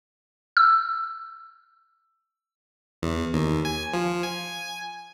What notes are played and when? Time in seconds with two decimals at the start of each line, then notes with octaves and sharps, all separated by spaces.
0.57 E6
3.03 E2
3.34 D#2
3.65 G#5
3.93 F3
4.23 G#5